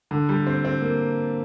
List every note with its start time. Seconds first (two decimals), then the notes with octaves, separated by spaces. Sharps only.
0.11 D3
0.29 G3
0.47 C4
0.65 C4
0.82 A#3